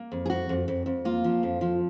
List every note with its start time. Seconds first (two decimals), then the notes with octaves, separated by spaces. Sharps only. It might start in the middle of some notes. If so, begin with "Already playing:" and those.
Already playing: A#3
0.12 F2
0.26 G#4
0.30 F2 F#4
0.49 F2
0.68 F2
0.86 F2
1.05 A#3 F4
1.24 F3
1.43 F2
1.61 F3